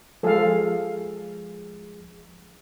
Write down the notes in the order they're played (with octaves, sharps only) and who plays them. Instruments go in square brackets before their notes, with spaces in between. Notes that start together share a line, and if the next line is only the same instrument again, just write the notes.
[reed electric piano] F3 G#3 G#4 [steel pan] A4 F5